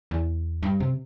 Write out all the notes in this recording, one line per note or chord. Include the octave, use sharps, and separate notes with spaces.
E2
G2
C3